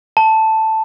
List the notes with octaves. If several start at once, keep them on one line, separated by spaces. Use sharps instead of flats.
A5